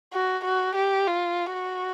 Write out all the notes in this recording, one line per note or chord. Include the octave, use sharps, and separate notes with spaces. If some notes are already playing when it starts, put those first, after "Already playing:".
F#4
F#4
G4
F4
F#4